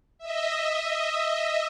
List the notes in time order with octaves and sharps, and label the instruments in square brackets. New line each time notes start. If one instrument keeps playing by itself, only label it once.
[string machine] D#5 E5